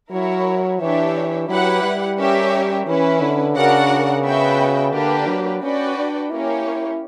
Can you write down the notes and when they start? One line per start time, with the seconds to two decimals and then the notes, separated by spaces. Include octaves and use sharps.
0.11 F#3 E4 A#4 C#5
0.80 E3 D4 G4 C#5 E5
1.49 F#3 E4 G4 B4 F#5
1.84 G3
2.18 C#4 G4 A#4 C#5 E5
2.86 E3 C#4 E4 B4
3.21 D3
3.56 C#3 D4 F#4 A#4 D5 F#5
4.24 B3 F#4 B4 E5 G5
4.93 D3 A#3 D4 G4 B4
5.28 F#3
5.62 C#4 F#4 B4 D5 G5
5.97 D4
6.31 A#3 C#4 E4 G4 C#5